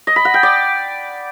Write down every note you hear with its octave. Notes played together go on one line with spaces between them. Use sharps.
D#5
B5
F#5
G5
D5